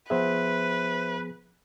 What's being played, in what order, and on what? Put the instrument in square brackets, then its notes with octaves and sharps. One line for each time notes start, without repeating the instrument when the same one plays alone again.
[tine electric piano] F3 B3 G#4 [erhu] B4 [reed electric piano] C5 E5